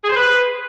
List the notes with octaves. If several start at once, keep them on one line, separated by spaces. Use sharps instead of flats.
G#4
C5
B4